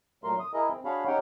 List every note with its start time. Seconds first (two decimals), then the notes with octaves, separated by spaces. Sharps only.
0.24 A#2 F#3 A3 A#4 C6
0.40 D#6
0.54 E4 G#4 A#4 D#5
0.70 C4
0.85 D4 F#4 G#4 C#5 F5 B5
1.07 C#4 D#4 G4 C#5 F#5 G5